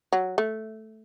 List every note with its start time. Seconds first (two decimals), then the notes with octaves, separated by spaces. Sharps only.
0.12 F#3
0.38 A3